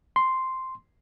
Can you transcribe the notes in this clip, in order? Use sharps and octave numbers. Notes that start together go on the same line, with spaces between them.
C6